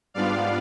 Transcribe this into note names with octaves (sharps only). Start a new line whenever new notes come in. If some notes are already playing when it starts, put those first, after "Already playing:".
G#2 G3 B3 D4 F4 D5 F5